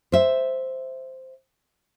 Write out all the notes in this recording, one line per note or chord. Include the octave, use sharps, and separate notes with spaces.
C5 E5